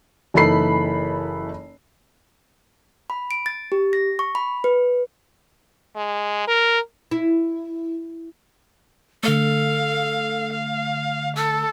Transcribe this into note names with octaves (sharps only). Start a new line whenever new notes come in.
F#1 E3 D#4 A4 B5 C7
B5
D7
A6
G4
A#6
C#6
B5
B4
G#3
A#4
E4
D3 A3 A4 F5
F5
A4 E6